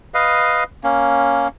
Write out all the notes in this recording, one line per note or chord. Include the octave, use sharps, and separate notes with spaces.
B4 D#5 F5
A#3 C#4